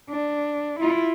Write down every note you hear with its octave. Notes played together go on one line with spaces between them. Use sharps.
D4
E4 F4